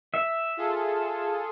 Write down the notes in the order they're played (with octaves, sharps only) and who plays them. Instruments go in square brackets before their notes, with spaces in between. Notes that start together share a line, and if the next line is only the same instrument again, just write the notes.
[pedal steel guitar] E5
[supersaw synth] F4 G#4 A4